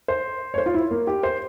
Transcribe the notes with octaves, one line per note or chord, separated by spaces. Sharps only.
C5
C#5
C5
F4
E4
A#3
G4
C5